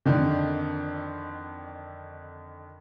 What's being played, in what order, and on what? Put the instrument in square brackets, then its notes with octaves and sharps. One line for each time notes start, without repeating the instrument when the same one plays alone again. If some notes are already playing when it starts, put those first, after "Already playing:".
[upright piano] F2 D3 D#3